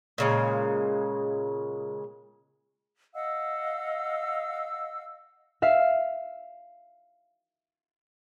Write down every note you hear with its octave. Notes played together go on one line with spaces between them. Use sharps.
A#2 C#3 G#3
D#5 F5 F#5 E6
E5 F5